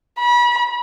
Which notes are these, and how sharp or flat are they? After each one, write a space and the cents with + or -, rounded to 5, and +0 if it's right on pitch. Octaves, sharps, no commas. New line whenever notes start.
B5 -35